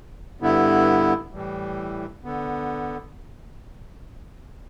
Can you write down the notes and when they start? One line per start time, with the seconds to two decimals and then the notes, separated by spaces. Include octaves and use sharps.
0.40 G2 D3 B3 E4
1.32 A2 E3 G3
2.24 D3 B3